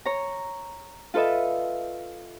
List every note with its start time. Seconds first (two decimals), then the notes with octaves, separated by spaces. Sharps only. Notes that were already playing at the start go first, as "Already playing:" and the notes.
0.05 C#5 A#5
1.14 F4 A4 B4 D#5 E5